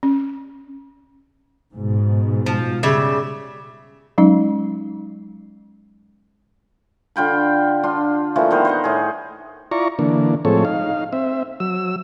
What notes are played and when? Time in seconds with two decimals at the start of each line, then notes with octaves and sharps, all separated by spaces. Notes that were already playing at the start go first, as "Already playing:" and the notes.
0.03 C#4
1.74 G#2 B2
2.46 F3
2.83 C#3 G3 E5
4.18 F#3 G#3 C#4 D#4
7.16 D3 F4 G5 B5
7.83 D4 F4 C6
8.35 E3 F3 A3 A#3
8.51 D#3 B3 A#4 C5
8.65 C5 D#5 F#5
8.84 A2 G#4
9.71 E4 F4 D5 A#5 C#6
9.99 D3 E3 A#3 D4
10.45 A2 F3 G#3 C4 A4 C#5
10.65 D#4 F5
11.13 C4 E5
11.60 F#3 E6